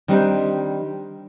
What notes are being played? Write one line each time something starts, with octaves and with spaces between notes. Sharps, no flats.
D#3 G3 C4 D4 D#4